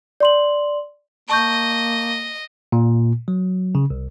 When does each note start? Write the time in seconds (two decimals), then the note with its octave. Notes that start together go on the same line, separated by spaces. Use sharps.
0.20 D5 C6 F#7
1.29 A#3 D#5 A5 C#6 G6
2.72 A#2
3.28 F#3
3.75 C#3
3.90 C2